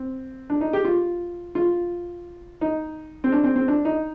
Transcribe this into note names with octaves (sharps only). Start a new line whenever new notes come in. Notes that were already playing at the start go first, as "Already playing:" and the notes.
Already playing: C4
D4
D#4
G4
F4
F4
D#4
C4
D4
C4
C4
D4
D#4